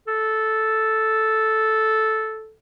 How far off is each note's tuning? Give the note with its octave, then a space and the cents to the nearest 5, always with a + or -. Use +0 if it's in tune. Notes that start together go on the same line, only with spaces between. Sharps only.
A4 -5